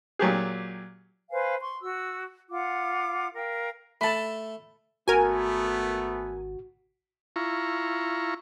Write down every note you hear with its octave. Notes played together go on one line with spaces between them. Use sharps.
A#2 F#3 G4 G#4
B4 C5 F5 G#5
C6 C#6
F#4 E6
F4 F#5 D6
A#4 F5 G5
A3 A4 A5 B5
G#1 A3 B3 F#4 A#4 G#5
E4 F4 A#5 C#6